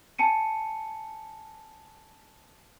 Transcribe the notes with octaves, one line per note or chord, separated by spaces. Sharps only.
G#5 A5 C#7 D#7